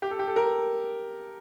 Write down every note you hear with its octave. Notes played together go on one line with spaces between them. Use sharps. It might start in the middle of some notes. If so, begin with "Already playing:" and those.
G4
A4
G4
A4
A#4